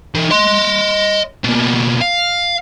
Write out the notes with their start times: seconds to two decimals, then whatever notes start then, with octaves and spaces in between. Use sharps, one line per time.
0.15 E3 D#4
0.31 D#5 C6
1.44 B2 A#3
2.01 F5